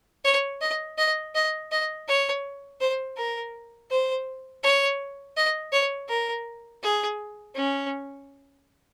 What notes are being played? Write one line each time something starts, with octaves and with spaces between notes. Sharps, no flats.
C#5
D#5
D#5
D#5
D#5
C#5
C5
A#4
C5
C#5
D#5
C#5
A#4
G#4
C#4